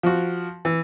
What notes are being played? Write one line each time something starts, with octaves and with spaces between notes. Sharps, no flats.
F3 F#4
E3